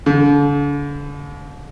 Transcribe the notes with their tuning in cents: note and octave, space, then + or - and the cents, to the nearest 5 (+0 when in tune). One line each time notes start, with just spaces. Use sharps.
D3 -40